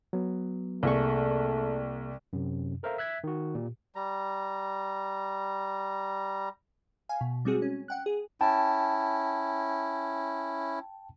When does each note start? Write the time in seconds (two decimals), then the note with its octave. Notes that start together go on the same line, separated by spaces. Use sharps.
0.13 F#3 B3
0.83 C2 A3 A#3 G#4 C#6
2.33 F#2 C3
2.83 A4 A#4 C5 E5 F5 A#5
2.98 E5 F#6 G#6 B6
3.24 D#3 F#4
3.55 A#2 G4
3.95 G3 A#5
7.09 F5 G#5
7.21 B2
7.45 G3 G#3 C4 F#4 G#4
7.62 C#4
7.88 F#5 G5 F#6
8.06 G#4
8.41 C#4 E4 G5 A5